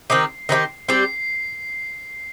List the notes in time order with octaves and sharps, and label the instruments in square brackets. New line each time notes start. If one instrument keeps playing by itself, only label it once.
[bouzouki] D#3 C4 D#4 G4 [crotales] C7
[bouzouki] D#3 C4 D#4 G4
[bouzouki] G3 C4 G4 [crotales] C7